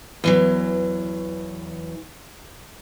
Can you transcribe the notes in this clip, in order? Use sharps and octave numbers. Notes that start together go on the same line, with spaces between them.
E2 E3 F#3